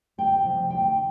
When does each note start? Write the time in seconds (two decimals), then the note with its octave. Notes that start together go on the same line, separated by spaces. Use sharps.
0.18 D2 G5
0.44 C3 F3
0.70 D2 G5